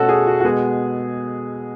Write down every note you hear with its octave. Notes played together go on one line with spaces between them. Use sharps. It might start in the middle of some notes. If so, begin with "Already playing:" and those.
Already playing: B2 A3 C#4 F#4 A4
G#4
F#4
F#4
B2 G#3 B3 G#4